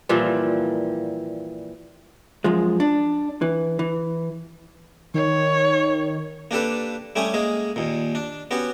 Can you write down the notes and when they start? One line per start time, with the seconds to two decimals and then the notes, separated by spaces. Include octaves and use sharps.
0.09 A#2 E3 F3 G3
2.44 F#2 F3 G#3
2.80 D4
3.42 E3
3.79 E3
5.14 D#3 C#5
6.51 A#3 D4 G4 A4 B4
7.16 G3 A3 C#4 G4 G#5 D#6
7.34 G#3 A#3 G#4
7.76 D#2 A#2
8.15 D4
8.51 B3 C#4 F#4 G4